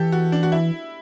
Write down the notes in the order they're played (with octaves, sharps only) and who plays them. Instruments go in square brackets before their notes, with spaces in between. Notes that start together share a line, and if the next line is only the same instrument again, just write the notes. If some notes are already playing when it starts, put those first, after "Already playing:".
Already playing: [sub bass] E3 [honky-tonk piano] G4 A4
[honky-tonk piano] F#4
D4
F#4
E4